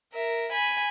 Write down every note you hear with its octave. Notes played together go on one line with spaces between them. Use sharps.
A#4 E5
G#5 B5